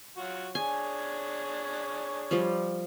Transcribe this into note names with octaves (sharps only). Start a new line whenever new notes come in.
F#3 F4 F#4
D4 G#4 C#5 G#5
F3 G3